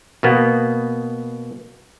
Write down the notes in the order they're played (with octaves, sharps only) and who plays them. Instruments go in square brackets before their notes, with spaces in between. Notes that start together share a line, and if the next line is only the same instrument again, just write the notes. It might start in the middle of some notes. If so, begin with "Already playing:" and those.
[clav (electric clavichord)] B2 A#3 B3